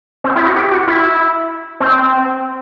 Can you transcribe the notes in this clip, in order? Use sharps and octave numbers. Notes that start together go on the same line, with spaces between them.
C4
E4
F#4
G4
F#4
E4
C4